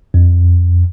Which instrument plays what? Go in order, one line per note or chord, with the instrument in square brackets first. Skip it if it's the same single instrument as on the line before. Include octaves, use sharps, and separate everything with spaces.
[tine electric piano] F2